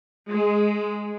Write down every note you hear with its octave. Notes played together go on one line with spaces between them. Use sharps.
G#3